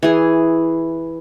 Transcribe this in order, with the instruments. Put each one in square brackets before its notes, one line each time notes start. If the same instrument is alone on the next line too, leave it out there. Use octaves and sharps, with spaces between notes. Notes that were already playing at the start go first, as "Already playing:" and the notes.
[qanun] E3 G#4